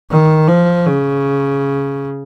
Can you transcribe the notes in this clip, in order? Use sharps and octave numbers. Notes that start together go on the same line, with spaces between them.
D#3
F3
C#3